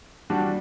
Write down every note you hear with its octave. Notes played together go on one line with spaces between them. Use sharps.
G3 D4 F#4